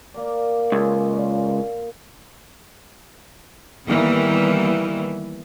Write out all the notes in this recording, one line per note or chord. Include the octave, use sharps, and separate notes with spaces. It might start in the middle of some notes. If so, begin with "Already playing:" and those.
A#3 A#4 D5
C#2
A#2
D#3 E3 G3 A#3 B3